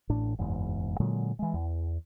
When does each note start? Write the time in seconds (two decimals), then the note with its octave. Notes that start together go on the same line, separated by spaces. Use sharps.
0.09 A1 A2 D4
0.39 F#1 E2 G#2
1.00 A#2 D3 F#3 G#3
1.39 E3 G#3
1.54 E2